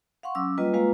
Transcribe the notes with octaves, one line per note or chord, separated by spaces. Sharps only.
F5 F#5 C6 C#6
F#3 C#4 D6 E6
G3 A#3 F4 B4 D#5
G#3 A#3 F4 B4 F5 A#5